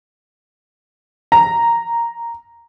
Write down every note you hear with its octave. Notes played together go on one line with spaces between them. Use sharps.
A#5